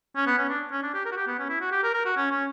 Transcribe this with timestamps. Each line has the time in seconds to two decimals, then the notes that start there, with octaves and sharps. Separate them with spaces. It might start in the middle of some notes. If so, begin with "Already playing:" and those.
0.16 C#4
0.27 B3
0.38 C#4
0.49 D4
0.72 C#4
0.83 D4
0.94 G4
1.05 A#4
1.12 F#4
1.17 G4
1.27 B3
1.39 C#4
1.49 E4
1.61 F#4
1.72 G4
1.83 A#4
1.94 A#4
2.05 F#4
2.17 C#4
2.31 C#4